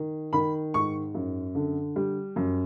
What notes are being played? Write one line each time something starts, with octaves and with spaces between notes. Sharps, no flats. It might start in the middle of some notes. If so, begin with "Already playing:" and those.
Already playing: D#3
D#3 B5
G#2 C#6
F#2
D3
G3
F#2